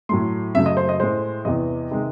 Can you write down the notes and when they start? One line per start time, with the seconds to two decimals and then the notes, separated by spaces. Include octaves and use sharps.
0.09 A2 F#3 A3 C6
0.55 F#2 C#3 F#3 A3 E5
0.66 D#5
0.77 C5
0.89 D#5
1.00 A2 G#3 C5
1.45 E2 C3 E3 D#5
1.91 C3 D#3 G#3